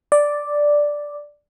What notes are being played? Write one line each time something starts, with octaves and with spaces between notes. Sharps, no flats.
D5